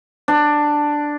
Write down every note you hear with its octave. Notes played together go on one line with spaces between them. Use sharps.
D4